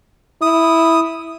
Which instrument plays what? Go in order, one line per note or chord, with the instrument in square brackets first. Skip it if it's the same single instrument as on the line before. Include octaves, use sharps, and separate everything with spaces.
[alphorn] E4 [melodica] D#6